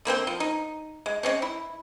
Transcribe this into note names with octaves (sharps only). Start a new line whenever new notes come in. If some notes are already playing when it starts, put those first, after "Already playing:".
D3 A#3 C4 C5
F3
D#4
G#3
G#3 C4 C#4
E4